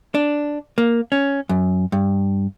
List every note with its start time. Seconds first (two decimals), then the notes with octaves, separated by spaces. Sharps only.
0.15 D4
0.78 A#3
1.12 C#4
1.49 F#2
1.92 G2